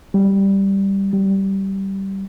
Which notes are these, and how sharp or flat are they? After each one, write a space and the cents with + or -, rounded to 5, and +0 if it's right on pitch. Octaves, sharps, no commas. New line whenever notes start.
G3 +0
G3 -15